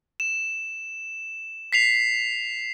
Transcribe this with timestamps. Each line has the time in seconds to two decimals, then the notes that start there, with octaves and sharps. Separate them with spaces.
0.20 E7
1.73 B6 C7 F7